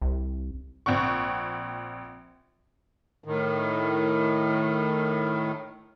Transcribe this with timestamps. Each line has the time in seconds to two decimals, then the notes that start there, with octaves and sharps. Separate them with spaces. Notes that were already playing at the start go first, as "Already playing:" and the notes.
0.02 C2
0.86 A#1 C4 F#5 C#6
3.24 A2 D#3